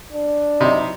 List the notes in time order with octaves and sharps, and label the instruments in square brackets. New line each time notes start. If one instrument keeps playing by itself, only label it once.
[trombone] D4
[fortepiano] C3 [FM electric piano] F#3 D#4 E4